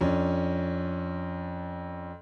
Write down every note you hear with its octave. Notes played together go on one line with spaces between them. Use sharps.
F2 C#4 D4